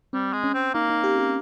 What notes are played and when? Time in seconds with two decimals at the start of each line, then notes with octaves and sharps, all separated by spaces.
0.13 G3 C4
0.33 G#3
0.44 C#4
0.54 C4
0.74 A#3 D#4
0.90 D#4
1.04 G4
1.19 G4